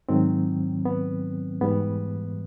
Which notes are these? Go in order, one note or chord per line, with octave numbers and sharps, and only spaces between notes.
G#2 D#3 F#3 C4
B3
G#2 E3 G3 B3